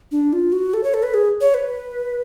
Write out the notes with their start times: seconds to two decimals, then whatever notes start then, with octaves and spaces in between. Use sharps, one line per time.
0.12 D4
0.33 F4
0.52 F#4
0.74 A4
0.84 C#5
0.94 A4
1.03 B4
1.14 G#4
1.41 C#5
1.54 B4